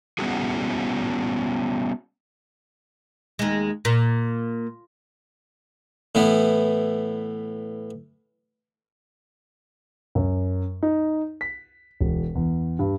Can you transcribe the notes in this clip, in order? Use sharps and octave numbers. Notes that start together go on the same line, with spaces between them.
G3 B3 C#4 E4 F#4 G#4
D#2 G#3
A#2
A2 E3 B3
F#2
D#4
B6
E1
E2
G2